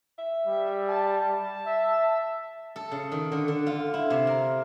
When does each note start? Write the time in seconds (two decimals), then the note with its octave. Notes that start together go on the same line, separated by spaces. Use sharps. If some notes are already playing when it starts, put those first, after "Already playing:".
0.18 E5
0.47 G3
0.89 A5
1.66 E5
2.76 A4
2.91 C#3
3.12 D#3
3.32 D3
3.48 D3
3.66 F4
3.94 E4
4.10 C3
4.27 A#4